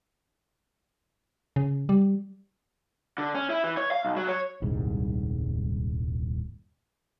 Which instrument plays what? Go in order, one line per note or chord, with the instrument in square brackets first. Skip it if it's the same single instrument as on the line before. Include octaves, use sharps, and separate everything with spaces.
[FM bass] C#3
G3
[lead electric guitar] D3
C#4
E4
E3
C#5
F5
B1
F#3
C#5
[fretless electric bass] D#1 C2 G#2